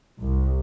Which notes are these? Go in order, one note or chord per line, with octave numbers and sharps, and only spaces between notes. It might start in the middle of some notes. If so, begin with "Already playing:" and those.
C2